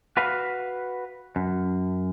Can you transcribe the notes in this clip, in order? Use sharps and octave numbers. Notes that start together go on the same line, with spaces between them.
F#4 B4 F5
F#2